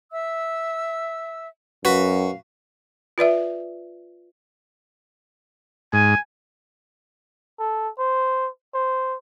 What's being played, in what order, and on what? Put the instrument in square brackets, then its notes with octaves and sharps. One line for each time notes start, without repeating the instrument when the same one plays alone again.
[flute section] E5 E6
[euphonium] F#2 [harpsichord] F#4 B4 [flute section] F5
[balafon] F4 B4 D5 E5
[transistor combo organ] G#2 [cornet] G#5
[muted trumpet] A4
C5
C5